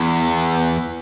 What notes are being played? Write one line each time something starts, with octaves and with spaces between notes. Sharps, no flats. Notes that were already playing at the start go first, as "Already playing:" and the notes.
Already playing: E2